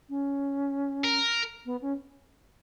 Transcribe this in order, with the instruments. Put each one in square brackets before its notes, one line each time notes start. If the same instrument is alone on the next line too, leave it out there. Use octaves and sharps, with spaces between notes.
[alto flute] C#4
[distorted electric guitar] A#4
[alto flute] B3
C#4